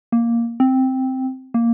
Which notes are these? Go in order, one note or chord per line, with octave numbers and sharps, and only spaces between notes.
A#3
C4
A#3